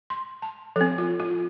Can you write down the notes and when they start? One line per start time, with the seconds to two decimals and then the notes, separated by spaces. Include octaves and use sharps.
0.10 C6
0.42 A5
0.76 F3 C4 A4
0.98 F4
1.20 F4